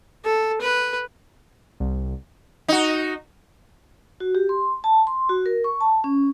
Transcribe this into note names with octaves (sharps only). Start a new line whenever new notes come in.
A4
B4
C2
D#4 F#4
F#4
G4
C6
A5
C6
F#4
A#4
C#6
A5
C#4